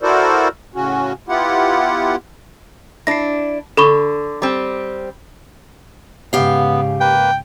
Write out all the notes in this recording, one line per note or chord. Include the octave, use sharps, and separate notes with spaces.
E4 F#4 A4 A#4 C5 D5
A2 C#3 C#4 F#4
B3 E4 F4 G4 F#5
D4 E4 A#6 C7
D3 A4 B5 C#6
G3 C4
G#2 C#3 B3 G4 F5
A#3 B4 G5